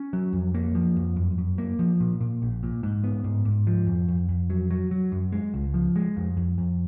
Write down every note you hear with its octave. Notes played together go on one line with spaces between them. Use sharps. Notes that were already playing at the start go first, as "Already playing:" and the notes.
Already playing: C#4
F#3
F2
A#3
F3
F2
F#2
F#2
A#3
F3
A#2
A#2
A#1
A#2
G#2
B3
G#2
G#2
F3
F2
F2
F2
F#3
F#3
F#3
F#2
G#3
C#2
F3
G#3
F2
F2
F2